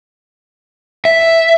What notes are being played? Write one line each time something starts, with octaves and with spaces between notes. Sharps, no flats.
E5